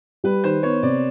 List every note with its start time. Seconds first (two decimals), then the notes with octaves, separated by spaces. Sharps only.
0.24 G3 B4
0.44 D#3 C5
0.63 B3 C#5
0.83 C3 D5